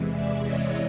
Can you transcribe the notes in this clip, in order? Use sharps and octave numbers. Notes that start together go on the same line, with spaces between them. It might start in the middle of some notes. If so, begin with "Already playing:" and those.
Already playing: E2 C3 E3 G#3
D5 E5
C#5 D#5